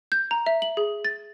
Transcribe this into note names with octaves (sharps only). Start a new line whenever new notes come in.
G6
A#5
E5
F#7
G#4
A6